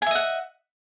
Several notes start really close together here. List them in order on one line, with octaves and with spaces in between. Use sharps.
G#5 E5 D#5 F#5